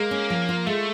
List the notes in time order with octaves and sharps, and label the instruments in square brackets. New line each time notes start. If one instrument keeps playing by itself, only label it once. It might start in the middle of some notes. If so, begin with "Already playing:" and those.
Already playing: [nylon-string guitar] G#3 [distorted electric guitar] A#3
[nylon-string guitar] C#4
F3
F4
[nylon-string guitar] G#3 [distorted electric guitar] A3